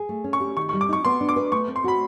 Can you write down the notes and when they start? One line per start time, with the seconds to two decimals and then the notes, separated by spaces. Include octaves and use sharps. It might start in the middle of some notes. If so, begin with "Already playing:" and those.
Already playing: G#4
0.09 A3
0.24 C#4
0.33 C#6
0.40 G4
0.57 D#3 C#6
0.69 C#6
0.73 G3
0.81 D6
0.89 D#4 C#6
1.05 B3 C6
1.21 D4
1.29 D6
1.36 B4
1.52 A3 C#6
1.68 C4
1.76 C6
1.84 F#4 B5